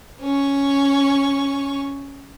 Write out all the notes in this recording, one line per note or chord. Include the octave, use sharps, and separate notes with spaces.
C#4 C#6